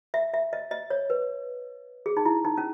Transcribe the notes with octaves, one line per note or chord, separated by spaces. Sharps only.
E5
E5
D#5
D#5
C#5
B4
G#4
D#4
E4
D#4
C#4